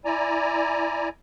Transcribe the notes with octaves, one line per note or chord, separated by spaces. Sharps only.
E4 D5 G#5 A#5